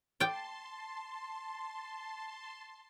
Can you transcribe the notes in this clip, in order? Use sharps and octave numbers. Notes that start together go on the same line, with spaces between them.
D5 G5 A5 C6